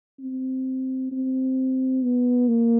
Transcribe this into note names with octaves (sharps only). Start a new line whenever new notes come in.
C4
C4
B3
A#3